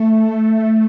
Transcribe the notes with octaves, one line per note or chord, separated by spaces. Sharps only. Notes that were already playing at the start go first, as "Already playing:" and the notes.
Already playing: A3